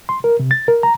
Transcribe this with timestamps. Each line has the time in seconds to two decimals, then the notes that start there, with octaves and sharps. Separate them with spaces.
0.09 C6
0.24 A#4
0.40 C3
0.51 A6
0.68 A#4
0.83 A#5